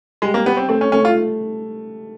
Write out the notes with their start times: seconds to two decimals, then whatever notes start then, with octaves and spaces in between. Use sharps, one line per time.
0.22 G3 G#3
0.34 A#3
0.46 B3 G4
0.57 C4
0.69 A3 C4
0.81 C#4
0.92 A3 C#4
1.05 F4